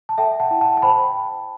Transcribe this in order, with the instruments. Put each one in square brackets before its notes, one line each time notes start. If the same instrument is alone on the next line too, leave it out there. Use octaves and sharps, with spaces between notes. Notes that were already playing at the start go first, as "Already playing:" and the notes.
[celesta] A5
A4 E5 G5
F#5 A5
E4
F#5 A5
A5
C5 G5 B5